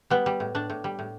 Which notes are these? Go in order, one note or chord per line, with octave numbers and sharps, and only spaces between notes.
G3 B3
G3
A2
A2 D4
A2
G3
A2